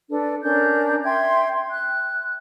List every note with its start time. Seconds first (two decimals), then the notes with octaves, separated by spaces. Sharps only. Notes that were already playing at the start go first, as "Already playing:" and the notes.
0.09 D4 A4 B4
0.42 C#4 D4 A#4 G6
1.04 E5 G5 C6 G#6
1.70 F#6